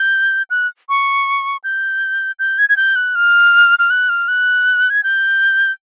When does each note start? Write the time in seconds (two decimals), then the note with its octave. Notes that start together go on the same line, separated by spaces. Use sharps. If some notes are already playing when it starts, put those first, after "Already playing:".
Already playing: G6
0.50 F#6
0.89 C#6
1.64 G6
2.39 G6
2.58 G#6
2.69 G#6
2.76 G6
2.96 F#6
3.15 F6
3.79 F6
3.90 F#6
4.09 F6
4.28 F#6
4.90 G#6
5.03 G6